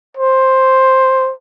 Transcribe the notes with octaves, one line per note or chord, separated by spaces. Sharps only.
C5